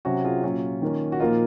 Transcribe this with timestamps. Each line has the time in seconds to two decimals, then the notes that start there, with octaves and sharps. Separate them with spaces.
0.05 C3 F#3 C#4 F#4
0.24 F4 G#4
0.44 A#2 F#3 C#4 F4
0.82 D#3 A#3 C#4
1.12 F#4
1.20 A#2 F3 A#3 D#4 F4